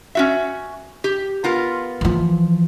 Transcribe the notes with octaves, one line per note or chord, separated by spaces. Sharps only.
C#4 F#4 E5
G4
B3 F4 A#4
E3 F3